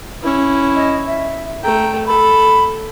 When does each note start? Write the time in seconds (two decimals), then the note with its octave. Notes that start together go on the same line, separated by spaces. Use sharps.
0.23 C#4 E4
0.75 D#5
1.06 E5
1.64 A3 G5 A#5
2.07 A4 B5